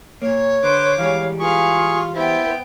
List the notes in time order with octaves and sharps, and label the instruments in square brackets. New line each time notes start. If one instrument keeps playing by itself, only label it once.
[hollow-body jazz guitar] A#2 A#3 [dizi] C#5
[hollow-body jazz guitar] D3 [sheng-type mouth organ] B4 C5 [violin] D6
[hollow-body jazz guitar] E3 G3 G#3 [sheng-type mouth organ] F5
[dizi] F4 [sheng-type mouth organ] G#4 C#6 [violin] B4 F5
[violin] B3 G5 [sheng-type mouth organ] E4 [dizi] C5